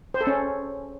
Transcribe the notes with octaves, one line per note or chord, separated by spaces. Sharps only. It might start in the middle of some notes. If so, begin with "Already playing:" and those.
C5
A4
C#4